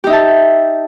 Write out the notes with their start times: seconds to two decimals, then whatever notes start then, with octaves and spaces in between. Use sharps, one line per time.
0.04 G4
0.07 D#4
0.10 E5
0.13 A5